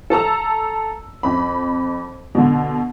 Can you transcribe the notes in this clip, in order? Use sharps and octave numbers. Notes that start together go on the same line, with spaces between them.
A4 A5 A#5 E6
F2 B5
B2 D3